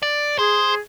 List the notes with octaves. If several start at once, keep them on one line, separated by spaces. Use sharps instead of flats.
D5
G#4 C5